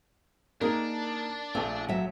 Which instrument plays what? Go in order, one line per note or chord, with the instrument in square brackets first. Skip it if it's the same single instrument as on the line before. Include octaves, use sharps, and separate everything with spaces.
[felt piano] A#3 D#4 G#4 [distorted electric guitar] D4 [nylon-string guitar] A#4
[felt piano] A#1 A3 [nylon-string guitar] F4
[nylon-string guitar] F#3 E5